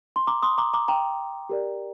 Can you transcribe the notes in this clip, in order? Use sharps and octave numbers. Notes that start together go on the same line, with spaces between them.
C6
A#5 D6
C6 D#6
A#5 D6
A#5 D6
G5 A#5
G4 A#4 D5